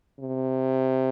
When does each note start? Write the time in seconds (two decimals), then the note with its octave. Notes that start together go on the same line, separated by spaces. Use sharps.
0.19 C3